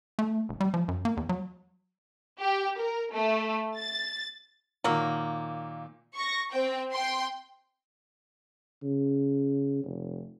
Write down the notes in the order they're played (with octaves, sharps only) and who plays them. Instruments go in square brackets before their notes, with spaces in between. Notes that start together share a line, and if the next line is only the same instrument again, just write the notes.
[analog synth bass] A3
E1
G3
F3
F#2
A#3
E2
F#3
[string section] G4
A#4
A3
A6
[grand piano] A#2 D#3 [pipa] F#3 A#3
[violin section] C#6 A#6
C4 G5
G5 C6
[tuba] C#3
F1